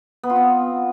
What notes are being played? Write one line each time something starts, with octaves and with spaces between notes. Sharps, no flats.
B3
F4
C4